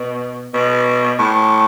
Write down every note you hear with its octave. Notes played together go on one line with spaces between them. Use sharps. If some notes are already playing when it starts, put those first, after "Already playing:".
Already playing: B2
B2
A2